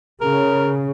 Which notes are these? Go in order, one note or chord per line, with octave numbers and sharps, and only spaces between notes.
C#3 A#4